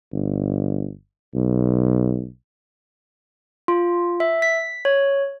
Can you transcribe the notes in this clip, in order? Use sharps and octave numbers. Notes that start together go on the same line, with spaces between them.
G1
B1
F4
E5
B6
C#5